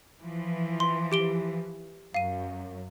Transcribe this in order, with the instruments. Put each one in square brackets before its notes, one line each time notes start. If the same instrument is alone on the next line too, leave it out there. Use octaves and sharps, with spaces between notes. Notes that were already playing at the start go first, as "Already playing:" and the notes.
[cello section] E3 F3
[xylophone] C6
G4 D7 G7
[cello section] F#2 [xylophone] F5 D#7